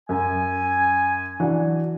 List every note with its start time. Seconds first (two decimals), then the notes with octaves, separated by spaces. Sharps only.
0.09 F#2 G#5
1.40 E3 F#3 D4